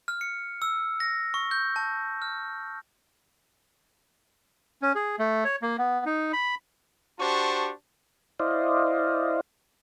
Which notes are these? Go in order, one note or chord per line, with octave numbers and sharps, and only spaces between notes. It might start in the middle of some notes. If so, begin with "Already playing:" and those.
F6
C#7
E6
A#6
C#6
G6
A5
F6
C#4
G#4
A3
C#5
A#3
B3
D#4
B5
D4 F#4 G4 C5 A5 C#6
E4 C5 D5 D#5 F5